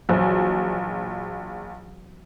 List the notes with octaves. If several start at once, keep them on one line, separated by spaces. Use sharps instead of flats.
A#1 E3 F#3 C5